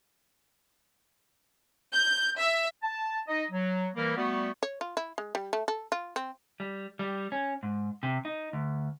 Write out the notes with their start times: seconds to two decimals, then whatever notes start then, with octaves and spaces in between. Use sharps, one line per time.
1.92 G6
2.38 E5
2.83 A5
3.28 D#4 D#5
3.51 F#3
3.96 E3 G3 A#3 A#4
4.17 G3 A3 B3 F#4
4.63 C#5
4.81 F4
4.97 E4
5.18 G#3
5.35 G3
5.53 A3
5.68 A4
5.92 F4
6.16 C4
6.60 G3
6.99 G3
7.32 C#4
7.63 G#2
8.03 C3
8.25 D#4
8.53 D2